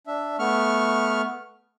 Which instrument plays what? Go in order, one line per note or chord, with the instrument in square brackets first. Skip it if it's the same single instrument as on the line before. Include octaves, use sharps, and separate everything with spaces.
[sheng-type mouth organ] D4 E5
A3 B3 C#6 F6